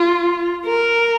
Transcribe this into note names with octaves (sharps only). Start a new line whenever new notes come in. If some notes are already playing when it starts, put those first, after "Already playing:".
Already playing: F4
A#4